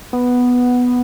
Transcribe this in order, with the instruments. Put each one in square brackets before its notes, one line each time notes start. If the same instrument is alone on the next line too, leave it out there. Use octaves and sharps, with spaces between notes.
[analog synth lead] B3